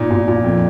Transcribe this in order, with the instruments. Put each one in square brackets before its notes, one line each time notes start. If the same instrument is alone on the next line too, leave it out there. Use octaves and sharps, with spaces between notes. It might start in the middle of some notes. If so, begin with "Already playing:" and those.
Already playing: [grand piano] A#2 D#4
A#2
A#2
F2